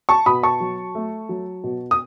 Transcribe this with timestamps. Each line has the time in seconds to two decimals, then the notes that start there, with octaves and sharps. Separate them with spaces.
0.09 A5 C#6
0.26 B2 B5 D#6
0.43 A5 C#6
0.60 F#3
0.95 A3
1.29 F#3
1.64 B2
1.91 D#6